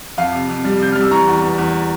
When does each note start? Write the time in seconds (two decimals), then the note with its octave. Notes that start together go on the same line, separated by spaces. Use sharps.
0.18 F2 F5
0.33 C3
0.49 F2
0.64 G3
0.80 C3 G6
0.92 G3 F6
1.01 E6
1.11 E3 A#5 C#6
1.27 E2
1.42 E2
1.58 E2